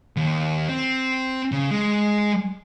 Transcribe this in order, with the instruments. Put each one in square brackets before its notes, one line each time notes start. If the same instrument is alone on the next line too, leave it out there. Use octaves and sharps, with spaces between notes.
[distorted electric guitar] D#2
C4
C#3
G#3